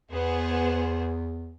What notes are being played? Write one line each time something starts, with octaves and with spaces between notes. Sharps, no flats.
E2 B3 G#4 C5